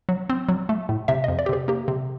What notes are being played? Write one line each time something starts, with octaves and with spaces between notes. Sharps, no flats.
F#3
C4
F#3
A3
A2
C3 E5
F2 D#5
D5
G4
C3 G#4
A#3 G4
C3